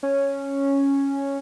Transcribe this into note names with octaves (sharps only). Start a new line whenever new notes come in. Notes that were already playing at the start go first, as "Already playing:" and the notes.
C#4